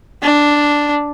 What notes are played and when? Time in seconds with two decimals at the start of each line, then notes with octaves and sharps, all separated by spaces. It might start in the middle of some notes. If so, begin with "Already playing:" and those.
0.23 D4